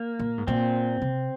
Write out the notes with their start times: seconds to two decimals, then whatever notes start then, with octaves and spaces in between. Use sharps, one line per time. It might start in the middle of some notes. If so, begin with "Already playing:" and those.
Already playing: A#3
0.19 A#2
0.38 G#2
0.47 A#2 C4
1.02 C3